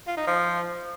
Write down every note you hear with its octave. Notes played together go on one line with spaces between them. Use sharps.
F4
D#4
F3